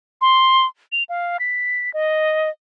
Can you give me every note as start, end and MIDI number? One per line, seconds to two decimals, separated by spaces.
0.21 0.66 84
0.92 1.03 101
1.09 1.37 77
1.39 1.92 95
1.94 2.49 75